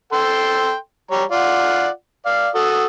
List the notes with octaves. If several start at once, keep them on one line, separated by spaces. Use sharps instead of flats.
A4 G5 C6
G3 C#5 A#5
F4 D5 F#5
D5 F5
F#4 A4 D#6